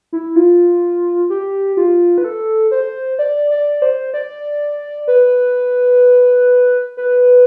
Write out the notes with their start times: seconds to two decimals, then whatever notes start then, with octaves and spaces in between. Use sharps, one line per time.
0.13 E4
0.36 F4
1.30 G4
1.77 F4
2.18 B4
2.24 A4
2.71 C5
3.19 D5
3.51 D5
3.82 C5
4.14 D5
5.08 B4
6.97 B4